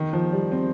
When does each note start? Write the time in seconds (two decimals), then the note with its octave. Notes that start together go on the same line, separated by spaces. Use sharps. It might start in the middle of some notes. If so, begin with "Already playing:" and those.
Already playing: D#3
0.13 F3
0.33 G3
0.52 C4